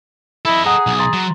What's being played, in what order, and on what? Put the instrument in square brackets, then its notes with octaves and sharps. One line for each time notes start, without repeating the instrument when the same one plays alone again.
[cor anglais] E4 [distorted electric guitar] A4 D#5
[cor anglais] G#4 [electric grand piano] F#5 A#5 D#6
[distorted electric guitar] B1
[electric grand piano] A#5 C6 A6
[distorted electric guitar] F#3